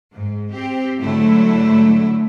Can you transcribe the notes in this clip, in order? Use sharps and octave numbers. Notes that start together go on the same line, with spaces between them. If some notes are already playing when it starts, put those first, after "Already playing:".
G#2
C4 G4
G#2 D3 F#3 A3 E4